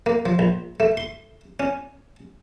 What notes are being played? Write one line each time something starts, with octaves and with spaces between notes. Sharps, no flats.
A#3
F3
A#1
A3
C6
C#4